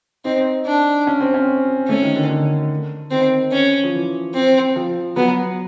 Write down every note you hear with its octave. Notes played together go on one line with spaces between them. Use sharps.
C4 D#4
D4
C#4
C4
C#4
A3 C#4
D#3
D3
D3
D#3 C4
C#4
F3
E3
C4
F3
F#3 B3